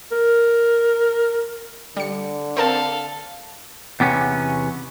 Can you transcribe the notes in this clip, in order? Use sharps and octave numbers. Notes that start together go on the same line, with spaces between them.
A#4
D3 G3 C#7
C4 A4 A#4 F5 A5
E2 C3 B3 C#4